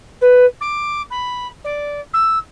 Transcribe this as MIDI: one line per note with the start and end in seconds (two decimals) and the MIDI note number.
0.21 0.45 71
0.60 1.02 86
1.10 1.47 83
1.64 2.00 74
2.13 2.38 88